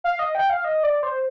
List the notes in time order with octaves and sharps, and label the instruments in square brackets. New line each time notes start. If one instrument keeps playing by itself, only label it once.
[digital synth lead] F5
D#5
G5
F5
D#5
D5
C5